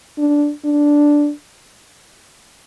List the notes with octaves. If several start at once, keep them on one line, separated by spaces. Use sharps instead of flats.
D4
D4